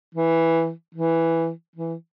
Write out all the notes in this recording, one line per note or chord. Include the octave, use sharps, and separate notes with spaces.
E3
E3
E3